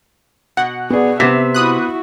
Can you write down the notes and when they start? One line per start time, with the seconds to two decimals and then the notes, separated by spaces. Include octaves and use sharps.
0.57 B2 F#5
0.90 B3 G#4 D5
1.20 C3 B3 E5 B6
1.54 E4 F#4 B5 D#6 F#6